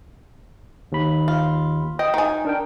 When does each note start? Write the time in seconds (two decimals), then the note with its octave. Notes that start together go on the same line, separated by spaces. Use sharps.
0.92 D#2 B5
1.28 F4
1.99 D#5 G5
2.14 D#3 G#5
2.45 D4 A#4 G5